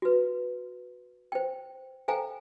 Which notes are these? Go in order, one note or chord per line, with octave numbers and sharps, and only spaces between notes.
F#4 B4
C5 G5
A4 C5 F5 G5 G#5 A#5